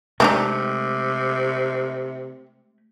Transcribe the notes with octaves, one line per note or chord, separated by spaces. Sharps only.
C3 G#3 A3 C4 D4 D#4